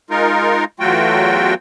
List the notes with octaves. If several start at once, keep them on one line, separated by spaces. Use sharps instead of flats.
G#3 D#4 F4 A#4
E2 F#3 A3 F4 F#4 G5